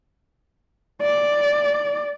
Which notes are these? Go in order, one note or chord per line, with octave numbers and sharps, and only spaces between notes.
D5